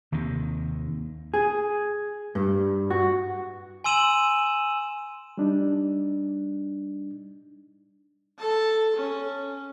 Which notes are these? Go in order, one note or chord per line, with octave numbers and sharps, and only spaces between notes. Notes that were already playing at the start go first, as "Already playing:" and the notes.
D#2 C3 D#3
G#4
G2
F#4
G#5 C6 E6 D#7 E7 F#7
G3 D4 D#4
A4 A5
C#4